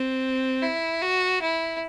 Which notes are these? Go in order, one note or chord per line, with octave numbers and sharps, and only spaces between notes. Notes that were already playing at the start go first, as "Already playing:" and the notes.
Already playing: C4
E4
F#4
E4